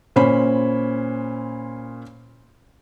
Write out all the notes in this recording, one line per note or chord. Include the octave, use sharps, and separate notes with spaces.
A#2 C#4 C5 C#5 B5